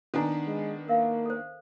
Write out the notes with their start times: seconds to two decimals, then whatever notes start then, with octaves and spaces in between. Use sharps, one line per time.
0.14 D#3 B3 D4 A4 G#5 A#5
0.47 G#3
0.88 A#3 A#4 E5 F5
1.26 A4 C5